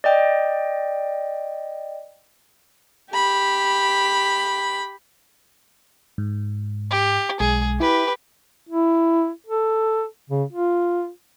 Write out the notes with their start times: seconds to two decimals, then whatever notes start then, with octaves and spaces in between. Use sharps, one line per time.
0.04 D5 D#5 G5
3.11 G4 B5
6.18 G#2
6.91 G4
7.40 B1 G#3 G#4
7.80 E4 G4 B4
8.69 E4
9.47 A4
10.30 C#3
10.52 F4